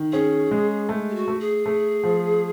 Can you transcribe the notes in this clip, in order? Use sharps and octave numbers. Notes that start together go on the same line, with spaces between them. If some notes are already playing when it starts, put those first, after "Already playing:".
Already playing: D#3
C#4 G#4
G#3
A3
G4
F#4
A3
G#4
A3
F3